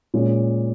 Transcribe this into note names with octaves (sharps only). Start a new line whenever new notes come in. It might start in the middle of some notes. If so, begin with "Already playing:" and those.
A#2 G#3 C#4